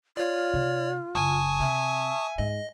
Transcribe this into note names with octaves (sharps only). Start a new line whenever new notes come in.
F4 C#5 D5
C3 D#4
F#1 G#5 A5 C#6 D#6
C3 E5
G#2 D#5